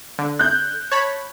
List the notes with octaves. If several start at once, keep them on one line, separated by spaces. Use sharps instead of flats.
D3
F#6 G6
C#5 A5 B5